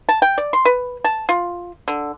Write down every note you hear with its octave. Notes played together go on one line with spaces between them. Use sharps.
A5
G5
D5
C6
B4
A5
F4
D3